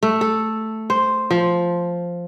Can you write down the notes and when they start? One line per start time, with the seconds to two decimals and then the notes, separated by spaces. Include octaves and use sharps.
0.03 A3
0.21 A4
0.90 C5
1.31 F3